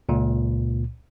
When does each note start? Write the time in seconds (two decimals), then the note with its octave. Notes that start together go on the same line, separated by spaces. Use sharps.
0.09 C#2 A#2